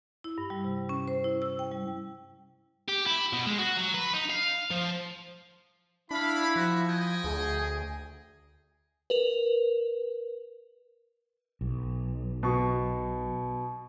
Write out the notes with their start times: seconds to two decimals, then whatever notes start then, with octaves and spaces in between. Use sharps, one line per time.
0.24 E4
0.38 G2
0.50 G3
0.64 C3
0.89 C#4
1.08 C5
1.24 E4
1.42 E6
1.59 G5
1.71 G3
2.89 G4
3.07 E4
3.33 B2
3.46 G#3
3.59 F#4
3.77 F#3
3.94 B4
4.14 D#4
4.30 F5
4.71 F3
6.11 D4 E4 F5 B5
6.56 F3 F#4
6.88 D#5 G5 G#5
7.24 D2 G#4
9.10 A#4 B4
11.61 B1
12.43 B2 C#6